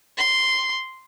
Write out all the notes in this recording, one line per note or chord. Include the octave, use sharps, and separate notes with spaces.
C6